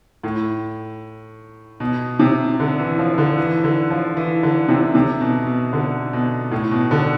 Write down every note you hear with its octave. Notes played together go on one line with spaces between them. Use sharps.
A2
B2
C3
D3
E3
F3
D3
E3
D3
F3
E3
D3
C3
C3
B2
B2
D3
B2
A2
B2
D3